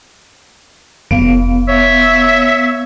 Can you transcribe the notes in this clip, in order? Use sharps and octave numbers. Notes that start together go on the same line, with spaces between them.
F1 B3 F5
C#5 E5